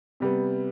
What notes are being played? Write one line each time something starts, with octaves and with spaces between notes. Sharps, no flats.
C3 G3 B3